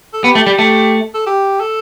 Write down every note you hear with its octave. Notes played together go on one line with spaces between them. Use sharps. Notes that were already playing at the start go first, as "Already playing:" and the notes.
A4
B3 G4
A3
G3
A3 G4
A4
G4
A4